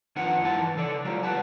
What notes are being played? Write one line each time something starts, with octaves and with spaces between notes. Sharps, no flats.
F2 D#3 D4 F4 B4 F#5
G2 E4 F#5 A5 C6
E3
C#3 A4 D5
F#3 G#3 F4 G4
G3 B4 F#5 A5